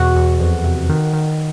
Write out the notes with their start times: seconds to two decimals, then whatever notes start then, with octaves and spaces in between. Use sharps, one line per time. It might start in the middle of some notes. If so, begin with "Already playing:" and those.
Already playing: E2 B2 F#4 F#5
0.15 E2
0.40 F2
0.64 C3
0.89 D#3
1.13 D#3